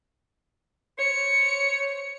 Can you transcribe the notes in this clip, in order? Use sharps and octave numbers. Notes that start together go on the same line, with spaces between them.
C5 C#5 C#7